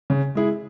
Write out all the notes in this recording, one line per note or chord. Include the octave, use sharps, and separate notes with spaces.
C#3
G#3 E4 G#4